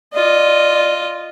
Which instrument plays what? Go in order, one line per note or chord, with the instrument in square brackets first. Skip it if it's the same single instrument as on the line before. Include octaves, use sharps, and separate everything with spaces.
[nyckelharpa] F4 D#5 [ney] D5